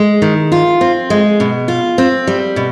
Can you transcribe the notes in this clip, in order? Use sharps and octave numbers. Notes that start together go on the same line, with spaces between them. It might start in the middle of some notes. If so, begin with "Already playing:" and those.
Already playing: G#3
D#3
F4
C4
G#3
B2
F4
C4
G3
B2